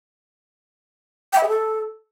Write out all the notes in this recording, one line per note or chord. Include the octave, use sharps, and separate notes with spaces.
G5
E5
G#4
A4